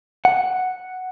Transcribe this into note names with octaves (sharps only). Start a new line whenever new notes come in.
F#5